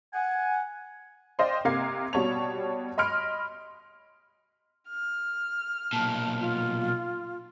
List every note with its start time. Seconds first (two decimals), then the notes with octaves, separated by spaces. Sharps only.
0.13 F#5 G#5
1.39 C5 D5 D#5 F5 G5 C6
1.65 C3 A#3 F5 A#5 G#6 C7
2.13 B2 G3 C#5 A5 F7
2.98 D#5 B5 C6 F6 D7
4.88 F6
5.93 B1 A#2 A5
6.40 F4